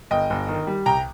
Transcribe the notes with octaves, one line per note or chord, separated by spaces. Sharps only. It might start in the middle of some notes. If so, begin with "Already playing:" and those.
G1 D#5 G5
G1
D#3
G3
C2 G5 A#5